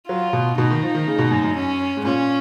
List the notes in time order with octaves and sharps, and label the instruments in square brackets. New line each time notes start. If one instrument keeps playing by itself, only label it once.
[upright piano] F#3 [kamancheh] F4
[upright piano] B2
[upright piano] B2 [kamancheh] D#4
[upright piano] D#3
F3
D#3
C#3
B2
F#2
F#2
[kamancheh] C#4
[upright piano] G#2
[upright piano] A#2 [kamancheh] C#4